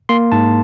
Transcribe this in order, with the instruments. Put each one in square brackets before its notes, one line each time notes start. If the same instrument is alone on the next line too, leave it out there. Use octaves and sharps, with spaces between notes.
[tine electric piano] A#3 C6
G#2 A5